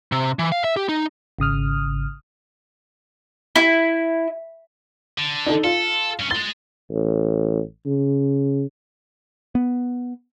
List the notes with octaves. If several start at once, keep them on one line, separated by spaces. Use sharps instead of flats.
C3
E3
F5
E5
G4
D#4
G#1 C#3 D#6 F6
E4
D3
D4 D#4 A4
F4 A4
G2 C#4
D#5 C6 A6
A1
C#3
B3